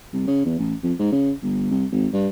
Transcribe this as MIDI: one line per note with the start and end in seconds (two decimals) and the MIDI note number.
0.13 0.23 36
0.27 0.44 49
0.45 0.57 40
0.59 0.74 33
0.83 0.93 41
0.99 1.12 44
1.12 1.31 49
1.43 1.70 31
1.71 1.85 36
1.91 2.07 32
2.13 2.28 43